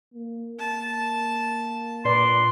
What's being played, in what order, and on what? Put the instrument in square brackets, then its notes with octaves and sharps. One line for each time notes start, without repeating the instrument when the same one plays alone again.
[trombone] A#3
[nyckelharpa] A5
[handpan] A#2 B4 D5 [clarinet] C6